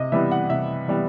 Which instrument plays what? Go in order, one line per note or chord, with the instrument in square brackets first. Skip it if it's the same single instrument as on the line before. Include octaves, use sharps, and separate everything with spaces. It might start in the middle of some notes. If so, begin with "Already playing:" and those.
Already playing: [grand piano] C3 D#5
E3 G3 B3 E5
F#5
C3 E5
E3 G3 B3